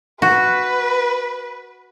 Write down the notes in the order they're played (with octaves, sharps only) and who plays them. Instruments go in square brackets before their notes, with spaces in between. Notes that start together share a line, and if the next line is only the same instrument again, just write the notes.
[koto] F#4 [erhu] B4